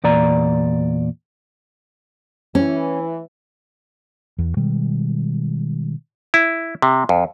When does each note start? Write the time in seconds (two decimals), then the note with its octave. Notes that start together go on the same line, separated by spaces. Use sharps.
0.04 E2 A#2 D5 A#5
2.55 E3 C#4
4.38 E2
4.57 B2 D#3 G3 G#3
6.34 E4
6.82 C3
7.09 F2